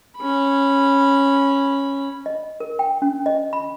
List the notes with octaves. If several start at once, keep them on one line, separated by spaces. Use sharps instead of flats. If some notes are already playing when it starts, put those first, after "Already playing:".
C#4 B5
D#5
A#4
G5
C#4
D#5
B5